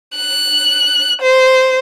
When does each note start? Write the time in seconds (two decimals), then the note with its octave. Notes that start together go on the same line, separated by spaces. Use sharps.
0.16 F#6
1.22 C5